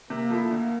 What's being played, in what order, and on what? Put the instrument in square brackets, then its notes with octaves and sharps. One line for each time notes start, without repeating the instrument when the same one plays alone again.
[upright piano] C3 [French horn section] A#3
[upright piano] F3 A3 E4
D2